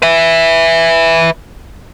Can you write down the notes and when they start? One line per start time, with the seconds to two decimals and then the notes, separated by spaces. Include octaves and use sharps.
0.02 B4 E5